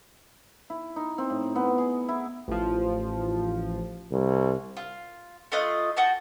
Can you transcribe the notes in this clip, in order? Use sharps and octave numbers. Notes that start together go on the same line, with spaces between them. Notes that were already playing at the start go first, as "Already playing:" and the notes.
E4
D#4
C4
A2
B3
G#4
E4
A1 F3
C2
F4
A3 F4 D#5 F#6
F#4 G5 A5